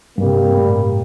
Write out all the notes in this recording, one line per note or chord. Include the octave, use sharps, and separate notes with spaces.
G2 C3 G3 A#3
A2